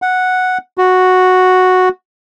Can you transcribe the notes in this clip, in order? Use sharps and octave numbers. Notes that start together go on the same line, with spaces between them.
F#5
F#4